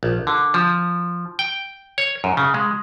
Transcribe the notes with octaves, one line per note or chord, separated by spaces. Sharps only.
A#1
D3
F3
G5
C#5
F#2
C#3
G#3